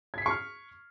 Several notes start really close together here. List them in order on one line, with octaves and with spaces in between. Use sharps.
G#6 B6 C7 C#6 F6